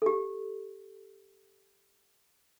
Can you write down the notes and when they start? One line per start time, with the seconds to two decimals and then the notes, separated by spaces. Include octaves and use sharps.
0.02 G4 A4